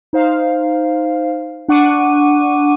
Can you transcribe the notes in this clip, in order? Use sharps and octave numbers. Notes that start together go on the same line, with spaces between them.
D#4 C5 F5
D4 F#5 C#6 D6 D#7